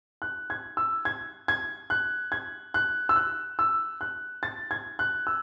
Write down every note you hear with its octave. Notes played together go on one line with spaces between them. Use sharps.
F#6
G#6
E6
G#6
G#6
F#6
G#6
F#6
E6
F#6
E6
F#6
A6
G#6
F#6
E6